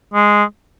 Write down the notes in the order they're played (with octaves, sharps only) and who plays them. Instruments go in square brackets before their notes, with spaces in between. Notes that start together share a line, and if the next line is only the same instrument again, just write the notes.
[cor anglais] G#3